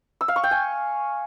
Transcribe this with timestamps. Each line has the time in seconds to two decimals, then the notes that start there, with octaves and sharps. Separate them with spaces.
0.21 E6
0.28 F5
0.36 C#6
0.44 G5
0.51 G#5